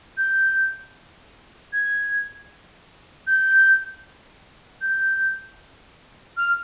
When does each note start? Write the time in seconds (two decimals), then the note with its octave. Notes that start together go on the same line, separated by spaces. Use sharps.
0.17 G6
1.73 G#6
3.27 G6
4.81 G6
6.37 F6